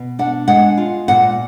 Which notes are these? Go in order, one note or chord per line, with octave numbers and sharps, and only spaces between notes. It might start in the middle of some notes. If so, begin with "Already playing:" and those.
Already playing: B2
D4 F#5
G#3 F#5
F4
A#2 F#5